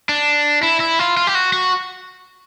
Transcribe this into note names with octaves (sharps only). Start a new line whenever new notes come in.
D4
E4
E4
F4
F4
G4
F#4
F#4